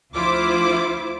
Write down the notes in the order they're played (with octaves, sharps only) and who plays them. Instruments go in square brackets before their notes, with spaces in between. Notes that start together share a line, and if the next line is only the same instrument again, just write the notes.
[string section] D2 F3 E4 F4 C5 D6